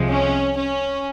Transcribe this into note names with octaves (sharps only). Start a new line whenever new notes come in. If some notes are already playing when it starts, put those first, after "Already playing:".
Already playing: C2 C3 F3 G#3
C#4
C#4